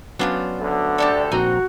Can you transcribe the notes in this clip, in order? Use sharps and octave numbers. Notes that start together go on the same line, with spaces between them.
F#3 B3 C#4 D4 F4 C5
D2 D3
D4 G4 A4 D5
A#1 C4 D#4 F#4 A#5